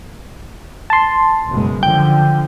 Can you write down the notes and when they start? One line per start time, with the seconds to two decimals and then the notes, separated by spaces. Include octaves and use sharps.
0.90 A5 C6
1.50 F#1 B2 G#3
1.83 D3 F3 G5 G6